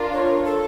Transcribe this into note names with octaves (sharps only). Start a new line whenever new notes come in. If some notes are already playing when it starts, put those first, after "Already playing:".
Already playing: D4 F4 A#4
C#5
A4